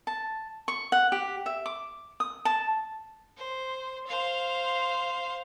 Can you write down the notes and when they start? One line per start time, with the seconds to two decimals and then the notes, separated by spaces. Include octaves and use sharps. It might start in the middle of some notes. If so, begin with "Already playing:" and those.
0.07 A5
0.68 C#6
0.92 F#5
1.12 G4
1.46 E5
1.66 D6
2.20 D#6
2.45 A5
3.37 C5
4.07 C5 F5